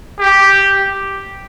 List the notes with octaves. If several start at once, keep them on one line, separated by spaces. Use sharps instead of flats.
G4